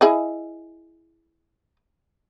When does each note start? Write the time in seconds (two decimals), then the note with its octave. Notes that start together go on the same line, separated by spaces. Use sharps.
0.01 E4 G#4 D#5